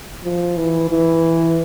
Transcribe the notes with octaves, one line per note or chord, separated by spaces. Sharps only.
F3
E3
E3